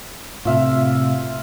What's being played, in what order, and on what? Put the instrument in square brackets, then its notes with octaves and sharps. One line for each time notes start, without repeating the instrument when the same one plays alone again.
[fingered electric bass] A2 C3 [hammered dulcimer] F4 E5 F5